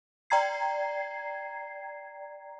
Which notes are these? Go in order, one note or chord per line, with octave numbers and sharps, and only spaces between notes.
D5 G5 A#5 G#6 C7